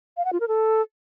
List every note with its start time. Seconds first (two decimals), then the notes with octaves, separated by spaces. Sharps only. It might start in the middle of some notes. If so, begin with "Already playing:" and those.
0.17 F5
0.25 F#5
0.33 F4
0.40 A#4
0.48 A4